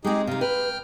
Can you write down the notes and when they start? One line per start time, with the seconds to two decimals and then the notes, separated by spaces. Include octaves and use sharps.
0.04 G#3 C4 D#4 G4 G#4
0.27 C3 D#4 F5
0.41 B4 G5 F6